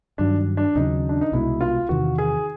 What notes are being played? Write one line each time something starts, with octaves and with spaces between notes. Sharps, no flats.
G2 D#3 F#3 D4
D4
D#2 C#3 F#3 D#4
D4
D#4
C2 B2 G#3 E4
F4
E2 C3 D#3 F#4
G#4